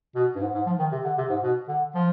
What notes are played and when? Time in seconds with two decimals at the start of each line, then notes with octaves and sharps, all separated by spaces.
0.15 B2
0.36 G2
0.42 G#2
0.54 G#2
0.66 F3
0.79 D#3
0.92 C3
1.04 D3
1.18 C3
1.30 G#2
1.43 B2
1.68 D3
1.95 F3